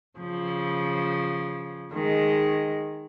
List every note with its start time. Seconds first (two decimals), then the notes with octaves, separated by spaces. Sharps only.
0.18 C#3 F3
1.93 D#3 G#3